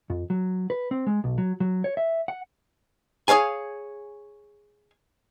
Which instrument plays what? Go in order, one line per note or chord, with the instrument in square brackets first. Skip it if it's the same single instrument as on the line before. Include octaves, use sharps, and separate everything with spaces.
[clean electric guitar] F2
F#3
B4
C4
G#3
B1
F#3
F#3
C#5
E5
F#5
[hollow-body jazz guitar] G#4 A4 C#5 F5 G#5